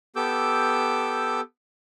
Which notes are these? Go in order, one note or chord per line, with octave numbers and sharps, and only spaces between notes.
B3 G4 A4 D6 E6 G6